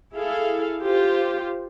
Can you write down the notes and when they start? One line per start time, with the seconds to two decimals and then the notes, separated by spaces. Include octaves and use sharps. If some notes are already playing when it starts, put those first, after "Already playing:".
0.16 E4 G#4 A4 F5
0.83 F4 G4 C5